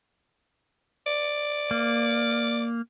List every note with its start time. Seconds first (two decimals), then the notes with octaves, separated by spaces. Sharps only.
1.06 D5
1.71 A#3